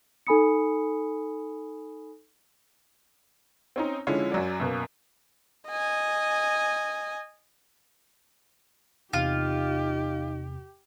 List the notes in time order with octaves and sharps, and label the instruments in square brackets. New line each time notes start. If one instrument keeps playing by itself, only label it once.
[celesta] D#4 A4 G#5 B5 D#6 C#7
[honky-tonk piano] C4 C#4 D#4
D3 F3 G#3 C#4 E4
F#2 F#3 D5
F#2 B2 A#3
[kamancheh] D#5 G#5
[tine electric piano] E2 C3 [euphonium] D#4 [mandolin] F4 [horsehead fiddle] G4